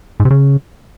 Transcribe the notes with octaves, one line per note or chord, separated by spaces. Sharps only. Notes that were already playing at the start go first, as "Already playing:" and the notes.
G#2
C3
C#3